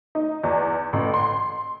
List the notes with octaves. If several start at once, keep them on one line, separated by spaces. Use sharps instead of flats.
D#4
E2
A1
C6